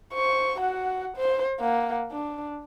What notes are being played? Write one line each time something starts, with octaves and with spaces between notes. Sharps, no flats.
C5 C#6
F#4 F#5
C5
A#3 F#5
D4